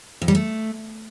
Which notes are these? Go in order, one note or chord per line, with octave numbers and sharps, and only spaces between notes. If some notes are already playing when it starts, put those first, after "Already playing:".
F2
G3
A3